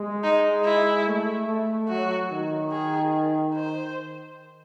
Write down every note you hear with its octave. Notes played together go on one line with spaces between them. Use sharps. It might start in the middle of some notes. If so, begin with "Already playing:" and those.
Already playing: G#3
D#4
E4
A3
A3
F#3 F#4
D#3
G#4
C5